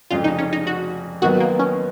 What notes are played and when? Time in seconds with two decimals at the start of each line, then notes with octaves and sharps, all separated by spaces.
0.10 F1 F2 C#3 G#3 F4
0.24 D#4
0.38 C#4
0.53 D#4
0.67 F#4
1.22 D#2 D#3 F#3 B3 D#4 F#4
1.40 A#3
1.59 C#4